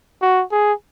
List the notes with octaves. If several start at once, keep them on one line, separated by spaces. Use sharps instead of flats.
F#4
G#4